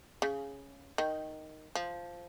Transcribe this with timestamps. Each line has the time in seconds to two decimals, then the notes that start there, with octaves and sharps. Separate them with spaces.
0.22 C#3
0.98 D#3
1.75 F3